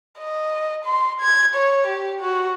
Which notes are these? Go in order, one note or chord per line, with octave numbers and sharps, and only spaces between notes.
D#5
C6
G#6
C#5
G4
F#4